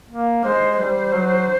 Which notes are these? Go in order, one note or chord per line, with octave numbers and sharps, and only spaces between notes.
A#3
G#3 C5
G3 C5
F#3